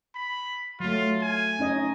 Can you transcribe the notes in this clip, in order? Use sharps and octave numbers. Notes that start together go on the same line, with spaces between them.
B5
F#3 A3 F4
G#5
C#4 D#4 D#5